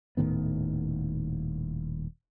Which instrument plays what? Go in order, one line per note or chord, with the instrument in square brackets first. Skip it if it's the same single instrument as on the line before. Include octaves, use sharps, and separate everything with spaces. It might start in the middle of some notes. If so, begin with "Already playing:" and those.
[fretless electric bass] D#1 A2 D#3 B3